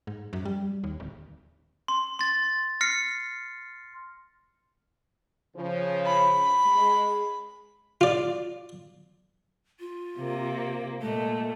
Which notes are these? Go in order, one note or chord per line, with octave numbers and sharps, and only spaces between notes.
G#2
F#2
G3
D#2
D1
C6
C6 A6
F6 A#6 C7 C#7
C#3 F3
B5
G#3
F4 D5
F4
C3 A#3
A#2 G#3 A3